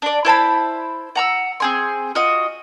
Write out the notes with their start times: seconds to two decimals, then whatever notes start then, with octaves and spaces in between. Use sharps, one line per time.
0.02 D4 D5
0.25 E4 C5 A5 B5
1.15 F#5 A#5 E6
1.60 C4 G#4 C6
2.15 F4 F#4 D#5